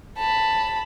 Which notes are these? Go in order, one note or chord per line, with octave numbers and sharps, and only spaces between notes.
A5 B5